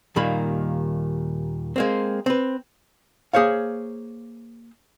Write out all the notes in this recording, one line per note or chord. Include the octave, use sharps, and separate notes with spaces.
D#2 A#2 D#3 G3 A#3 B5
G#3 A#3 C4
C4 B4
A#3 G#4 C5 C#5 F5